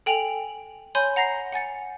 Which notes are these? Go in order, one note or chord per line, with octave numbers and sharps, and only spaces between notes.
A4 G5 G#5 F7 F#7
C#5 G#5 B5 C6 G6
F#5 A#5 A#6 C7
F#5 G#5 A6 C#7